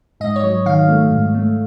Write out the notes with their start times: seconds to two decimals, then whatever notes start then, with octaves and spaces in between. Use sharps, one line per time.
0.20 G#2 D#5
0.36 C#5
0.43 F#3
0.66 D#3 F5
0.89 A3
1.11 G#2
1.34 A3